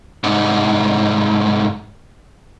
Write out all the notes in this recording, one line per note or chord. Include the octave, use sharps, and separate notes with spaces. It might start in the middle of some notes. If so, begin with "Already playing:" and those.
C2 G#2